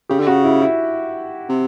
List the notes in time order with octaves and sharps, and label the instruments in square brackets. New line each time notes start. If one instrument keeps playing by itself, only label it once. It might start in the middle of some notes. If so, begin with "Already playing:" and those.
[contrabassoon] C#3 [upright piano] G4
[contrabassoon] D3
[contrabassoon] C#3 [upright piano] F#4
[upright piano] E4
E4
[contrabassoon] C3